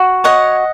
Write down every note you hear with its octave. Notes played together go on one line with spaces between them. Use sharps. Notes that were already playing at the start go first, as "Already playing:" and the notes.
Already playing: F#4
C#5 D#5 F#5